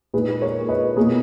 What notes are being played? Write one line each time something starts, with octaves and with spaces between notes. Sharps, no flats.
A#2 G#3 D#4 G#4 B4
A#4 C#5
B4 D#5
B2 A#3 E4 G#4